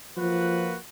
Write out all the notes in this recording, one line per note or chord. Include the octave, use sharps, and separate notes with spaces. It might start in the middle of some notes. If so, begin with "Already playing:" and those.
F3 A#3 F4 F#4 B4